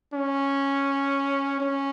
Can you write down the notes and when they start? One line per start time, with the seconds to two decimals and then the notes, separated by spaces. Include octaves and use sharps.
0.14 C#4
1.60 C#4